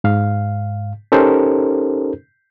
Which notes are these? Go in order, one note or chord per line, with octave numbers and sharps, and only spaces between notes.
G#2 F5
C#4 D#4 G4 A4 A#4 C5